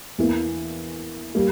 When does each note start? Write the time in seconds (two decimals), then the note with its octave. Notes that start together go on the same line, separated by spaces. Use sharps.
0.18 E2 E3 A#3
1.35 G3 A#3